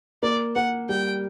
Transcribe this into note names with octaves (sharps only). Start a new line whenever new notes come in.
A#3 D5
A#3 F#5
G3 G5